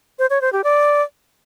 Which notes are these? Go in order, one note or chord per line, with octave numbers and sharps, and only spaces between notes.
C5
C#5
C5
G4
D5